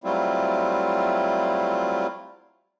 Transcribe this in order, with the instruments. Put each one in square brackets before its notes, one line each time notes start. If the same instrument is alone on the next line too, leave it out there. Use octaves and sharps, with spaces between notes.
[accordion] F#3 G3 A3 C4 E4 F4